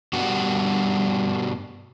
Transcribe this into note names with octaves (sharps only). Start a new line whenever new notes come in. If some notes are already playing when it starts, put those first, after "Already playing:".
G2 B2 G3 D4 F#4